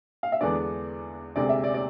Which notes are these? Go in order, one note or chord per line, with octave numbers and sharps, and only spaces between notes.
F5
E5
E2 D3 G#3 B3 D4 D5
D2 C3 G#3 D5
E5
D5
D5